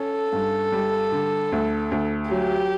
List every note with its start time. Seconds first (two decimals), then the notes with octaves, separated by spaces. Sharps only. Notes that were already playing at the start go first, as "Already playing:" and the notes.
Already playing: C#4 A4
0.32 G2
0.72 G3
1.12 D3
1.52 D2
1.91 D2
2.31 F#3 G4